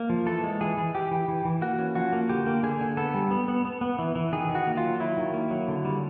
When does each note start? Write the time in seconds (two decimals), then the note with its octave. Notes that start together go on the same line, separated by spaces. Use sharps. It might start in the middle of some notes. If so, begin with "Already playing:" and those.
Already playing: A#3
0.10 F3
0.26 E3 A4
0.44 G#3
0.61 E3 G#4
0.77 E3
0.95 E3 G4
1.11 E3
1.28 E3
1.45 E3
1.61 A#3 F#4
1.79 C#4
1.95 F3 F#4
2.13 A#3
2.29 D3 G4
2.46 A#3
2.63 D3 G#4
2.81 D3
2.97 B3 A4
3.14 G3
3.31 B3
3.48 B3
3.65 B3
3.81 B3
3.99 E3
4.15 E3
4.32 D#3 G#4
4.49 D#3
4.55 F#4
4.67 A#3
4.77 F4
4.83 F#3
5.00 F#3 E4
5.17 D#3
5.34 A#3
5.51 F#3
5.68 D3
5.85 G3